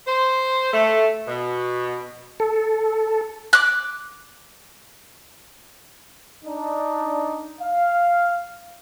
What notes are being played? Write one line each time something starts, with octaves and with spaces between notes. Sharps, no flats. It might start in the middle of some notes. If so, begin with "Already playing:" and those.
C5
A3
B2
A4
D6 F#6
D4 D#4
F5